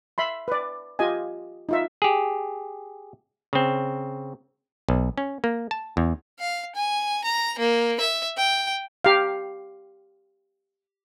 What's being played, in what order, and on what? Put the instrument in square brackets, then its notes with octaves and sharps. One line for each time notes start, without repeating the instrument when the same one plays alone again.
[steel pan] E5 B5 C6
B4 D5
F4 G4 D#5 G#5
D#4 F4 E5
[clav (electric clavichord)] G4 G#4
C#3 C4
B1
C#4
A#3
A5
E2
[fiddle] F5
G#5
A#5
A#3
E5
G5
[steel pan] G4 F5